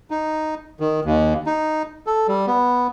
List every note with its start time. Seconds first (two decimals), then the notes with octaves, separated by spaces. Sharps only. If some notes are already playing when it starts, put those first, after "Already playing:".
0.11 D#4
0.80 D#3
1.05 D#2
1.46 D#4
2.07 A4
2.28 G3
2.47 B3